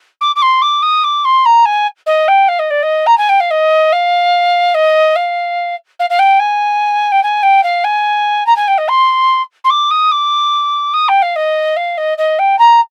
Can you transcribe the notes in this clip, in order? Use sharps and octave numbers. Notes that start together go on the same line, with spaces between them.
D6
D6
C6
D6
D#6
D6
C6
A#5
G#5
D#5
G5
F5
D#5
D5
D#5
A#5
G#5
G5
F5
D#5
F5
D#5
F5
F5
F5
G5
G#5
G5
G#5
G5
F5
G#5
A#5
G#5
G5
D#5
C6
C6
D6
D#6
D6
D#6
G5
F5
D#5
F5
D#5
D#5
G5
A#5